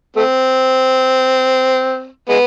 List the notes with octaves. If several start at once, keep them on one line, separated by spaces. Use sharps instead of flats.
A3 C4
G#3 B3